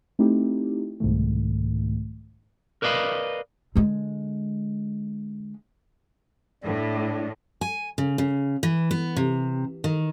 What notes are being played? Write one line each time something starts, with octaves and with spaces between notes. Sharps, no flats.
A3 C4 D#4 E4 G4
C2 G#2 B2 D#3 A3
A#4 B4 D5 D#5 F5 B5
D3 G#3
A2 D4
G#5
C#3
C#3
E3
B3
C3
D#3